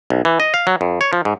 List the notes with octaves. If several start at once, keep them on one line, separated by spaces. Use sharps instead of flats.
B1
E3
D#5
F5
F#3
F2
C#5
F3
G#2